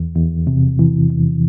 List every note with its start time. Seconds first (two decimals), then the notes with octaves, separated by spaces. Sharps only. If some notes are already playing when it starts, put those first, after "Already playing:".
Already playing: E2
0.16 E2
0.47 C3
0.79 E3
1.10 E2